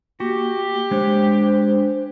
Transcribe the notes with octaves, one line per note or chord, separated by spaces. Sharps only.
A#3 F#4 G4
G#3 D4 C5 C#5